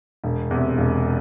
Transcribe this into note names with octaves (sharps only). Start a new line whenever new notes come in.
E1
E2 C3
E1